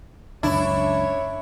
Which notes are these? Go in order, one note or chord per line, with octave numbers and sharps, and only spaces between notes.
C#2 F#2 D4 E4 C#5